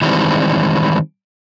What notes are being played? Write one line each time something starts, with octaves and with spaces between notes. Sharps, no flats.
D#3 E3 G3 G#3 C4